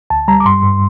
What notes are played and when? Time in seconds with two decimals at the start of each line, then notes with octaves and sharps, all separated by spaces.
0.10 D2 A5
0.28 G3 A#5
0.40 D6
0.46 G2 C6
0.63 G2